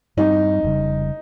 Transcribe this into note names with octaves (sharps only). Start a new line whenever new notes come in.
G2 G3 C4 D#4
F1 D#2 C#3 G3